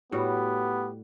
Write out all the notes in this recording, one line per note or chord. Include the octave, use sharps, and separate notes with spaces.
A2 G3 B3 F#4 G4